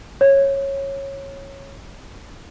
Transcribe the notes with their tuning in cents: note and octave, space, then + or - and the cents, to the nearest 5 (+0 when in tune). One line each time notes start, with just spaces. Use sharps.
C#5 -15